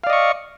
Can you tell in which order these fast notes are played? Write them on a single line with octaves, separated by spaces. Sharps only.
F5 D5 D#5 C#6